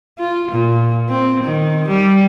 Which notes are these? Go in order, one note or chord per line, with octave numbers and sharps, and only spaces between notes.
F4
A#2
C4
D#3
G3